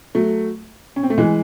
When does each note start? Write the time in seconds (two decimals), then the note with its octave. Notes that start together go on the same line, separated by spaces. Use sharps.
0.15 F#3 A3
0.96 C#4
1.03 C4
1.10 A3
1.18 E3 G#3